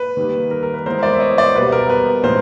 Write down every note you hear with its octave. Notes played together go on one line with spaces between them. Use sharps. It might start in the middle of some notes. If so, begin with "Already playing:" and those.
Already playing: B4
D#3 G3 A#3
A#4
A#4
B4
E3 G#3 B3 E4 A#4 C5
C5 D5
E5
C#5 D#5
C5 D5
B2 G3 B3 B4
A#4
B4
A2 E3 G#3 C#4 F4 A#4 C5